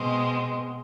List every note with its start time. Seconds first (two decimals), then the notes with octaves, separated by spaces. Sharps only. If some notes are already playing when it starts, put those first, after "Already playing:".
Already playing: B2 G#3 C4